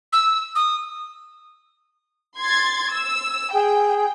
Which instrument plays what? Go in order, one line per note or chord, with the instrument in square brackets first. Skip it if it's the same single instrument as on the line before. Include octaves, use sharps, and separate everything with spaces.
[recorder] E6
D#6
[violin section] C6 G#6 A6
E6
[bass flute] G#4 [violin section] G5